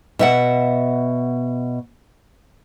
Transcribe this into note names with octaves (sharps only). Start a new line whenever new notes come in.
B2 E5 F#5